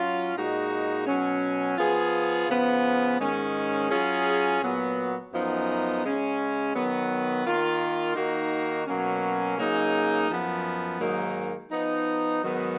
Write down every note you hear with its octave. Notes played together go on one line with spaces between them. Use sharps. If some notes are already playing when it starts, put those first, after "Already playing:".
Already playing: F#3 C#4 F4
A#2 G#3 D#4 F#4
B2 F#3 C#4
F3 B3 F4 G#4
C#3 F3 B3
G#2 D#3 G#3 C#4
F#3 C#4 F4 G#4
A#2 F#3 B3 F#4
F#2 F3 B3 D#4
C#3 G#3 C#4
D#3 F#3 B3
D#3 A#3 F4
D#3 A#3 D#4 F#4
B2 F#3 A#3 C#4
C#3 F#3 A#3 D#4 G#4
F#2 F3 B3
G#2 D#3 F#3 A#3 D#4
F3 B3 D#4
G#2 D#3 F#3 B3